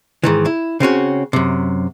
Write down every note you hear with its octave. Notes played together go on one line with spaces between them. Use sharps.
G#2 D#3 E3
E4
C#3 C4 C#4 F#4
F#2 C3